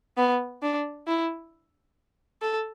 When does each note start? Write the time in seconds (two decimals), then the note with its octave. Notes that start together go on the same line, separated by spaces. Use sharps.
0.17 B3
0.62 D4
1.08 E4
2.42 A4